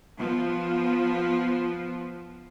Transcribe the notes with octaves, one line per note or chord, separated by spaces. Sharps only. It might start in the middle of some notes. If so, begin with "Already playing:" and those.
F3 B3